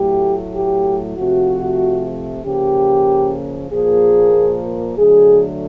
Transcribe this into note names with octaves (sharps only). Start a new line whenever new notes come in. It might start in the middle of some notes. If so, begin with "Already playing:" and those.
Already playing: A2 F#3 A3 G4
G4
C3 F3 A3 F#4
C#3 F3 A#3 G4
A#2 F3 A#3 G#4
D3 F#3 A3 G#4